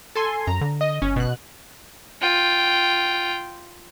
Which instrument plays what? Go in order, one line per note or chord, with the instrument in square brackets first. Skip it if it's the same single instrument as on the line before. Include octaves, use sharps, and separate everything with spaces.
[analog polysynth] A4 G#5 C6
[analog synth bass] F#2 [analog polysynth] A#5
[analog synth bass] D3
[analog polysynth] D#5
[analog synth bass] G1 [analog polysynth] C#4
[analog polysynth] B2 F#6
[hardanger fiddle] F4 G5